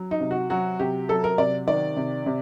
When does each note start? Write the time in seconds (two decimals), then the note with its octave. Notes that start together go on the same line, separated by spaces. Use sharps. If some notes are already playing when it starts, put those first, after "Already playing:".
Already playing: F#3
0.11 D#4
0.20 C3
0.31 F#4
0.50 F#3 F#4
0.79 C3 G4
1.09 F#3 A4
1.24 A#4
1.38 C3 D5
1.67 D#3 D5
1.96 C3
2.26 C3